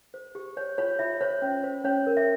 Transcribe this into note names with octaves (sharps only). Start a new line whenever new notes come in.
C5
G4
C5 C#5
F4 C#5
F4 E5
C5 C#5
C#4
C5
C#4 C#5
A#4
E5